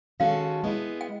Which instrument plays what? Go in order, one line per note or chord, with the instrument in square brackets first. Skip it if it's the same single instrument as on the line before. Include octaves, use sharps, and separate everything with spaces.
[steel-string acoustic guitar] D#3 G#3 C#4 F#4 A4 [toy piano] F5
[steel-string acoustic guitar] G#3 B3 E4
[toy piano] G5